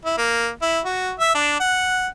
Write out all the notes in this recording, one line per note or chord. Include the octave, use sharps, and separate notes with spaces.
E4
A#3
E4
F#4
E5
D4
F#5